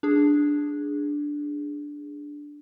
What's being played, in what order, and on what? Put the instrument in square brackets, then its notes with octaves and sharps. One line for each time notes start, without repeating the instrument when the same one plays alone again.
[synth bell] D4 G#4